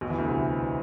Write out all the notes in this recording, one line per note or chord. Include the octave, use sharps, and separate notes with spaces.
B1 B2
E2 E3
D2 D3
C2 C3